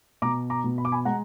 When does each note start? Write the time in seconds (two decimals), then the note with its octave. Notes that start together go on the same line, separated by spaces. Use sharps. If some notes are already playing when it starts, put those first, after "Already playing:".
0.22 B2 A#5 D6
0.50 A#5 D6
0.64 B2
0.78 B5
0.85 D6
0.92 G#5 B5
1.05 G#3 F#5 A#5